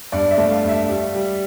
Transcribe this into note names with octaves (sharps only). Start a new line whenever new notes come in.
G2 D5
E5
A3
F5
G2
E5
G3
G3